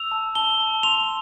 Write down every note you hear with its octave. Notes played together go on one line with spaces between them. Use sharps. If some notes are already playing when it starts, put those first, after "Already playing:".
Already playing: E6 F7
A5
A5 G7
A5
C6 F7